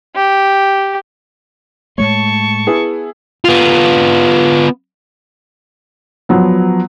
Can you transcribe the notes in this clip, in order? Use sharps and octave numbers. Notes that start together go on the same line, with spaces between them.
G4
A2 G#3 A3 C#5 A5 C#6
B3 E4 G#4
B3 F4
F3 F#3 B3